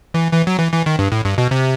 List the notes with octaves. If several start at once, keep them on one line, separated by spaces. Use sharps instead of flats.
E3
E3
F#3
E3
E3
D#3
G2
A2
G2
B2
C3